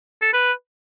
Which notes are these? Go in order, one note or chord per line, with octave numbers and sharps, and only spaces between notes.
A4
B4